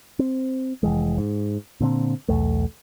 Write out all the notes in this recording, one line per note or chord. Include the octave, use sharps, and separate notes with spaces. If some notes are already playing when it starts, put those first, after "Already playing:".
C4
F1 E3 G#3
G#2
A#2 D3 C4
B1 E2 A3